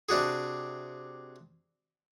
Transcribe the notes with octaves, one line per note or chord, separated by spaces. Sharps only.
C3 D4 F#4 G#4